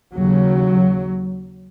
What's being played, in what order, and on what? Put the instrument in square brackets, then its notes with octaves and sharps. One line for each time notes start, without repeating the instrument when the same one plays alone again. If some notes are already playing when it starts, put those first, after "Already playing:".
[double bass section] D#2 C#3 F#3